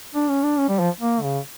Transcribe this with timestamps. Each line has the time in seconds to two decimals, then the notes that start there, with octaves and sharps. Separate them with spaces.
0.15 D4
0.29 C#4
0.43 D4
0.59 C#4
0.69 G3
0.80 F3
1.01 A#3
1.22 C#3